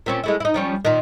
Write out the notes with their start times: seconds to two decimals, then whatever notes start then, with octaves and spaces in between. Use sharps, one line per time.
0.06 A#2 C4 C#4
0.24 G#3 A3 E4
0.40 D#4 E4
0.54 F3 G3 C#4
0.85 A#2 D#3